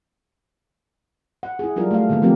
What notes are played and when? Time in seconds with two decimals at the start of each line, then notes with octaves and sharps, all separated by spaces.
1.43 F#5
1.59 E4 G#4
1.76 F#3 G3 D4 F4 A#4
1.91 A3 F5
2.09 D3 D#3 G#3 A#3 B3
2.22 F3 G#3 A3 C4 G4 A#4